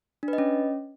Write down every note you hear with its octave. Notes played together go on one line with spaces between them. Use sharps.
D4
B4
D#5
C#4